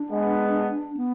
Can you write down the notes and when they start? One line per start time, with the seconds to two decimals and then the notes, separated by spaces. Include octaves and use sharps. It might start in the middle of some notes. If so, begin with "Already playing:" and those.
Already playing: D4
0.10 G#3 B3
0.97 B3